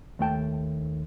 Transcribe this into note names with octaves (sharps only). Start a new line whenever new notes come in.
D#2 A3 G5 A5